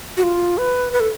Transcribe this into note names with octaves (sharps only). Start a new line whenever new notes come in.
F#4
F4
B4
B4
A4